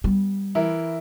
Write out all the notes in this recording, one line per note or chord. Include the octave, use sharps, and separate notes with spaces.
G3 B3
E3 E4 A#4